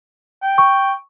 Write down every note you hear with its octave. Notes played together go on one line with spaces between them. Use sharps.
G5
C#6